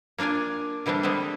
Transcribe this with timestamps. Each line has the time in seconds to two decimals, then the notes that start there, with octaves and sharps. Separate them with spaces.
0.18 A#3 D4 F4 D5 G#5
0.86 D3 E3 G3 C4 D4
1.03 D3 G3 G#3 B3 C4